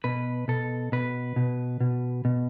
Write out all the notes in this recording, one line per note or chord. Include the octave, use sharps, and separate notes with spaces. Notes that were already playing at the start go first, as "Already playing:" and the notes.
B2 B4
B2 A4
B2 B4
B2
B2
B2